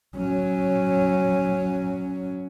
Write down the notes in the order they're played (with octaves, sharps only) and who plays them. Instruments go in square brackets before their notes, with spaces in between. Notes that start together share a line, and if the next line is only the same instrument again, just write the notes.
[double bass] F#3 C#4